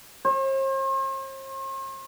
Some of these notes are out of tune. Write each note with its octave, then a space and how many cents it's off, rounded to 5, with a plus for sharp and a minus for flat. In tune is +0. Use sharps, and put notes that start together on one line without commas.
C5 +45